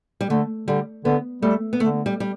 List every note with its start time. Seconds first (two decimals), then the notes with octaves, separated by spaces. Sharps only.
0.21 G3
0.30 D3 A3
0.68 D3 G3
1.05 D3 B3
1.42 G3 A3
1.73 B3
1.80 D3 A3
2.06 G3
2.20 G3